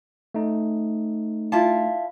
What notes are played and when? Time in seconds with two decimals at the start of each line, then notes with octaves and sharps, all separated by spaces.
0.34 A3 D#4
1.52 E4 F4 A5